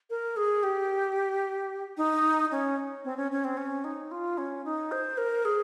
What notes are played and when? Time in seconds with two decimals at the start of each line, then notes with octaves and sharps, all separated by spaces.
0.10 A#4
0.37 G#4
0.63 G4
1.97 D#4
2.51 C#4
3.04 C4
3.17 C#4
3.32 C#4
3.44 C4
3.57 C#4
3.84 D#4
4.11 F4
4.38 C#4
4.65 D#4
4.92 C5
5.18 A#4
5.45 G#4